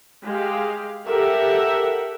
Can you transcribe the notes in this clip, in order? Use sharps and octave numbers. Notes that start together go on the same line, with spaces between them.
G#3 G4 F5
G4 A4 A#4 E5 F#5